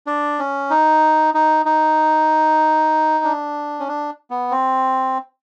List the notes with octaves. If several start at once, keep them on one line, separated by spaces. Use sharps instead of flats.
D4
C#4
D#4
D#4
D#4
D4
C#4
D4
B3
C4